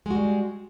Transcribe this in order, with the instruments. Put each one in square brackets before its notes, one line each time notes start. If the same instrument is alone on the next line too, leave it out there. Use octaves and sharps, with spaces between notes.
[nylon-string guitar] G#3
F#4
G3